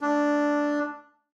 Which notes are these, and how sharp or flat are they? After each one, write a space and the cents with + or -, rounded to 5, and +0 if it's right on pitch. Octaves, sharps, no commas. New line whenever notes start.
A3 +0 D4 +0